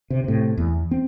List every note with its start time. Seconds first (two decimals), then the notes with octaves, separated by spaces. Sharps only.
0.10 C3
0.24 A2 C3
0.57 E2
0.91 C4